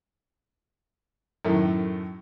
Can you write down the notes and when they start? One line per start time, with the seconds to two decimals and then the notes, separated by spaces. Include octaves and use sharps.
1.45 F#2 A2 D#3 A3